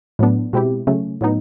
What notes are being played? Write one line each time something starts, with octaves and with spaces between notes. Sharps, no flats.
A2 F#3 B3 D4
B2 G#3 C4 E4 G4
C#3 F#3 A3 C#4
A2 F#3 B3 D#4